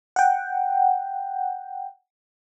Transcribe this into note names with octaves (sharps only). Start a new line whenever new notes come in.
F#5 G5